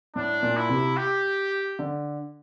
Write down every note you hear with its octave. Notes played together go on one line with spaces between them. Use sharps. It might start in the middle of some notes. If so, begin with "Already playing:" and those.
A2 D4
A#2
E4
C3
G4
D3